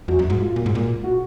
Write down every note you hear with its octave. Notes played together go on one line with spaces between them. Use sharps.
F2 F#3
F#2
G#2
F4
A#2
G#2
A#2
F#4